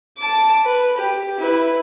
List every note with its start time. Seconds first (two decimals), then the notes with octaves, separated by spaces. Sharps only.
0.18 A5 D6
0.65 B4
0.97 G4
1.40 E4 B4